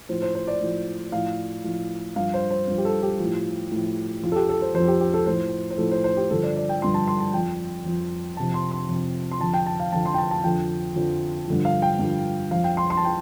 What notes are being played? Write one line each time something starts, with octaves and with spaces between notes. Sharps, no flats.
A2 F3 C5
C5
C5
D5
A2 F3
A2 F3 F5
A2 F3
G2 F3 F5
C5
C5
G2 F3
G4
A4
G4
A2 F3
A2 F3
F2 F3 F4
A4
G4
A4
C5
F2 C5
F3
G4
G4
A4
A2 F3 C5
C5
A2 F3 A4
C5
C5
G4
G2 D3 F3 A4
D5
D5
G5
G2 D3 F3 C6
A5
C6
A5
F2 F3 G5
F2 F3
F2 C3 F3 A5
C6
C6
F2 C3 F3
C6
F2 D3 F3 A5
G5
A5
F5
F2 D3 F3 A5
C6
G5
A5
A5
F2 D3 F3 G5
F2 D3 F3
G2 D3 F3
F5
G5
G2 D3 F3
F2 F3 F5
G5
C6
C6
A5
F3 G5